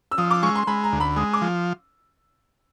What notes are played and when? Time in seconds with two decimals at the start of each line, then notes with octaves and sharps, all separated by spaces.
0.11 E6
0.18 F3 D#6
0.31 D6
0.43 G#3 C#6
0.55 C6
0.67 G#3 B5
0.84 A#5
0.93 D2
1.00 B5
1.17 G#3 D#6
1.33 D6
1.41 F3